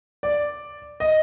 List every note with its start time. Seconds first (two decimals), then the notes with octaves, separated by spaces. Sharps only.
0.23 D5
1.00 D#5